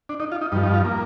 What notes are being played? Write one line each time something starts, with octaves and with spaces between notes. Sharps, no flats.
D4
D#4
F4
D#4
G2 F3 D#4
D#4
F4
A#3